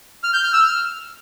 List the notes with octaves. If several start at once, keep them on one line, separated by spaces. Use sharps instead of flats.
F6
G6
F6
E6
F6